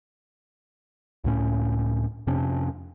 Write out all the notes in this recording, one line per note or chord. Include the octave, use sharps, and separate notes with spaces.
C#2 A2 C#4
F2 C3 C#4 D4